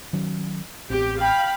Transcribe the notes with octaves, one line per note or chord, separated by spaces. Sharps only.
D#3 F#3 C#4
A1 B3 C4 G4
F5 G5 B5